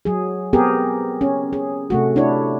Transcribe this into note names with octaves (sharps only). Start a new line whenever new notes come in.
F#3 G#4
B3 C4 G4 G#4 A#4
C#4
G#4
C3 A3 F#4
D4 E4 C#5